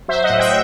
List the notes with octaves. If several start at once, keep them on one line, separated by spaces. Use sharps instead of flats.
F#3 C5 E5
D#5 F#5
A2
E5 G5